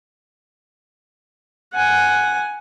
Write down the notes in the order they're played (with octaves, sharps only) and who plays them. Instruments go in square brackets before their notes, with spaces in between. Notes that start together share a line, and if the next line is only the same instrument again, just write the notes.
[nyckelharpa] F#5 G#5